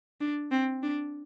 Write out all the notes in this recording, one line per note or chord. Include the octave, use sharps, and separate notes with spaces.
D4
C4
D4